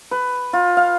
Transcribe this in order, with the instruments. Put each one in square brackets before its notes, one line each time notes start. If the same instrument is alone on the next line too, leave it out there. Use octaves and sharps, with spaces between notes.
[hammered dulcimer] B4
F4
F5